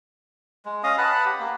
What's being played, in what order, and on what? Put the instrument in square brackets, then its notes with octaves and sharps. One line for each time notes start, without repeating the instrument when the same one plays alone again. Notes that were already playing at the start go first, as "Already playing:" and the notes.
[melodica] G#3
C#4 D#5 F5 D#6
B4 F#5 A5 B5
G4
A#3